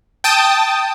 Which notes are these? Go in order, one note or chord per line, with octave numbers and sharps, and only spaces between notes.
G5 A5 D#6